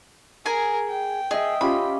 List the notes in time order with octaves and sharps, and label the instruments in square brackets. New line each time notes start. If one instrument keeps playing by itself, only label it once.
[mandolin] G#4 G#5 [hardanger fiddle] A#4
[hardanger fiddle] G5
[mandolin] G#4 [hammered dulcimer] D#5 E5
[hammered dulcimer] C#4 F4 G4 [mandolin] B5